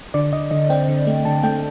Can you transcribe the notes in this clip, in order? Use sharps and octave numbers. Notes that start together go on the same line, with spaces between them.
D3 D5
D3 D#5
D3 D#5
C4 G5
D3
A3
D3 A5
A3 G5